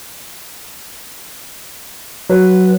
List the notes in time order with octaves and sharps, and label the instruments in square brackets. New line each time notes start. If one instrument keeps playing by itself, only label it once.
[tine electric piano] F#3 [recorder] B4